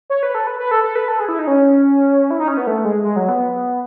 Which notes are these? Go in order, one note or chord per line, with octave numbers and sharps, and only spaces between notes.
C#5
B4
A4
B4
B4
A4
A4
B4
A4
G#4
E4
D#4
C#4
E4
D#4
C#4
B3
A3
G#3
G#3
F#3
B3